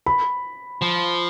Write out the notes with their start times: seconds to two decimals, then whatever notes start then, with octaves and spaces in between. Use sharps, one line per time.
0.06 B5
0.82 F3